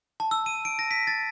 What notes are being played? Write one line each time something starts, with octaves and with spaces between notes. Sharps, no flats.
A5
E6
D#7
D7
A#6
B6
A6